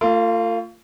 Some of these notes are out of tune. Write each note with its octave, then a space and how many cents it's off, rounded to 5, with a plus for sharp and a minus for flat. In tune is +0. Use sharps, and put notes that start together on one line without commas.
A3 +45 F4 -10